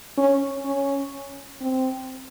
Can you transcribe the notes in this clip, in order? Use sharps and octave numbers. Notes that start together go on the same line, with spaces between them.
C#4
C#4
C4